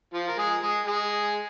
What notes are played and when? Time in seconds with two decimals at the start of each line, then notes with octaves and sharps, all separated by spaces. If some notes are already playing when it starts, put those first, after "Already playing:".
0.14 F3 F4
0.28 A#4
0.37 G#3 G#4
0.62 G#3 G#4
0.86 G#3 G#4